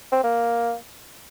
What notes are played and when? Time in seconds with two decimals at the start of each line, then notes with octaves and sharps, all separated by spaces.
0.12 C4
0.24 A#3